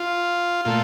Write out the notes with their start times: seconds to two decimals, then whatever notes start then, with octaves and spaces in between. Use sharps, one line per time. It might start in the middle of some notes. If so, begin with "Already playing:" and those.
Already playing: F4
0.65 A#2 A3 F4